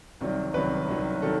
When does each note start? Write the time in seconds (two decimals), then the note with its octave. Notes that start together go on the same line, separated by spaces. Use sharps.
0.21 C2 C3 D#3 F#3
0.54 C2 C3 D#3 F#3 B4
0.89 C2 C3 D#3 F#3
1.22 C3 D#3 F#3 A4